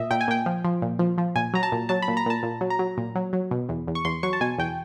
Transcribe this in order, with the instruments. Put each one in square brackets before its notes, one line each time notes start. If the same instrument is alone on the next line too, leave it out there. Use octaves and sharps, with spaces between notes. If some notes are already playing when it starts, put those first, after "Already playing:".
Already playing: [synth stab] A#2 D#5 E5
A#2 G5
G#5
A#2 G5
F3
F3
A#2
F3
F3
A#2 G#5
F#3 A#5
A5
A#2
F#3 A5
B5
A#2
A#5
A#2 A5
A#2
F#3
A#5
F#3
A#2
F#3
F#3
B2
E2
E2
C#6
E2 C6
F#3 C#6
A5
B2 G#5
E2 G5